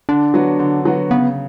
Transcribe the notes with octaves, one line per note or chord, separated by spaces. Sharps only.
D3 D4
F#3 B3 F#4
D3
F#3 B3 F#4
C#3 B3